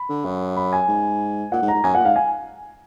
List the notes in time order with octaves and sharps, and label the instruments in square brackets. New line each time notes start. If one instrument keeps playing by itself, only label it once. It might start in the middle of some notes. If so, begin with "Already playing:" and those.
Already playing: [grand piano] B5
[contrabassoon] D3
F#2
[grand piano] B5
G#5
[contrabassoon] G#2
[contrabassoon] A#2 [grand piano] F#5
[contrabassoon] G#2
[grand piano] A#5
[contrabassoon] G#2
[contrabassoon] F#2 [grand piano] G#5
[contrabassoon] A#2 [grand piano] F#5
[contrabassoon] G#2 [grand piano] F5
[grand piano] G#5